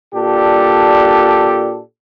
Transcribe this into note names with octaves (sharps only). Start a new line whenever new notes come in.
A#2 D4 G4 A4